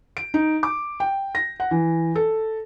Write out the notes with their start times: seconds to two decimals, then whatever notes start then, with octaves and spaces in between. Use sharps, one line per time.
0.17 D7
0.34 D#4
0.63 D6
1.00 G5
1.35 A#6
1.60 F#5
1.71 E3
2.15 A4